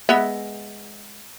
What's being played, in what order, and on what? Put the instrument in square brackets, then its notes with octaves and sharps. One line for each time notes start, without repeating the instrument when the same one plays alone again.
[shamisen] G#3 B3 E5